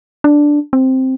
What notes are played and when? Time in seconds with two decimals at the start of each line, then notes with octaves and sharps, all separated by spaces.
0.24 D4
0.73 C4